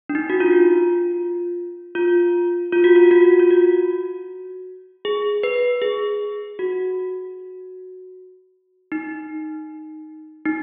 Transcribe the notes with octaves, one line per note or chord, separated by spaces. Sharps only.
D4
D#4
F#4
F4
F4
F4
F#4
F4
F#4
F4
F#4
G#4
B4
G#4
F#4
D#4
D#4